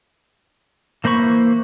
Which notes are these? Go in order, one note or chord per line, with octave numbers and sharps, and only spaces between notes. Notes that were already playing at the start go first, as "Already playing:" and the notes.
E3 A#3 C5 B5 C#6